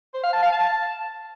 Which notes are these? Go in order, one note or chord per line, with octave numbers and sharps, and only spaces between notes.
C5
F5
A5
F5
A5